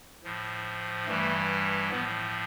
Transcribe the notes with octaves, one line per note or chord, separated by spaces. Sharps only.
A2 F3
G2 E3 G3 A3
A2 F3 B3